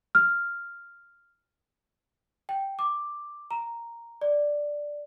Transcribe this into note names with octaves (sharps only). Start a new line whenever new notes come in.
F6
G5
D6
A#5
D5